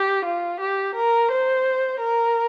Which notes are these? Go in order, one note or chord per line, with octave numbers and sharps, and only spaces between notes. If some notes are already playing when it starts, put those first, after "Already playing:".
Already playing: G4
F4
G4
A#4
C5
A#4